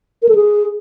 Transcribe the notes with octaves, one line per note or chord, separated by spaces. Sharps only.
A#4
A4
G#4